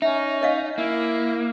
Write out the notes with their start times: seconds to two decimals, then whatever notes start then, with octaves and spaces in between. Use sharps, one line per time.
0.02 C#4 D#4 E5
0.42 C#5 D#5 F5
0.78 A#3 E4